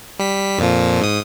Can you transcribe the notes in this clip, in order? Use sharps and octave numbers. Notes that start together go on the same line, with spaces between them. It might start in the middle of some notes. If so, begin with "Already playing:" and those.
G3 B6
F2 A#2 F3
G#2 D#6